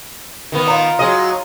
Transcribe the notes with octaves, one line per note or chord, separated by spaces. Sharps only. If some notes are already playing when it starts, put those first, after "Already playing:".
D#3 B3
D#4 F4
F#3 G#3 D#5